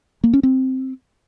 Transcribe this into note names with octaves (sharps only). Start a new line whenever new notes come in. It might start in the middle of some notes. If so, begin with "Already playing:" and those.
A#3
C#4
C4